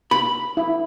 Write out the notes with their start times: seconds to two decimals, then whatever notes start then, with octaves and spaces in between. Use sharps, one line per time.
0.11 B5
0.57 E4